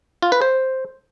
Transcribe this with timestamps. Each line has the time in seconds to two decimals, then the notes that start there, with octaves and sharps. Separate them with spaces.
0.22 F4
0.32 B4
0.42 C5